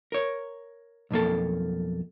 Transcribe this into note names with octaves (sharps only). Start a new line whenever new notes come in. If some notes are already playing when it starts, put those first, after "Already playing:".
A#4 C#5
B1 F2 A#3 A4